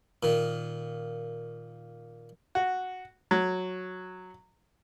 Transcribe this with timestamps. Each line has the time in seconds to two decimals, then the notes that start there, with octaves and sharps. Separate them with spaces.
0.23 A#2 D#3
2.55 F#4
3.31 F#3